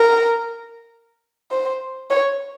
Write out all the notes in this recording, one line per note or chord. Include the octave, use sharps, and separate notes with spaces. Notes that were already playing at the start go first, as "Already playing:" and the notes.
Already playing: A#4
C5
C#5